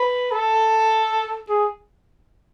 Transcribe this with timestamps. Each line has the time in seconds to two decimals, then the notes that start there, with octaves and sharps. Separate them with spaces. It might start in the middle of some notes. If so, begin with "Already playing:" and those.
Already playing: B4
0.31 A4
1.49 G#4